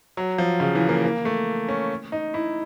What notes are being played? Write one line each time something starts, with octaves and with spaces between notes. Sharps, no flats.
F#3
F3
C#3
E3
A#3
A#3
A3
C#4
D#4
E4